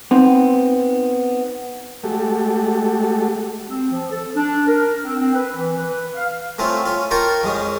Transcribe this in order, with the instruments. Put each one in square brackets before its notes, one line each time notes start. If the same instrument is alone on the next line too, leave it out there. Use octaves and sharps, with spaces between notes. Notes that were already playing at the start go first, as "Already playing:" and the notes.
[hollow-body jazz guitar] B3 C4 D#4
[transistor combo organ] G#3 A3 F#4 G4 A4
[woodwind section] C4
F3
A4
D4
A#4
C4
C4
B4
E3
B4
F5
[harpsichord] A3 C4 C#4 F4
C#4 F4
F4 A#4 F5 G5 A5 C#6
F2 G#3 C#4